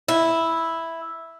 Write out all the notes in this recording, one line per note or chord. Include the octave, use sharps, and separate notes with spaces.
E4